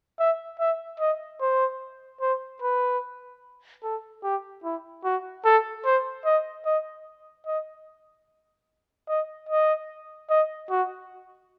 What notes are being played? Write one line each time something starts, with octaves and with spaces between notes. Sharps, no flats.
E5
E5
D#5
C5
C5
B4
A4
G4
E4
F#4
A4
C5
D#5
D#5
D#5
D#5
D#5
D#5
F#4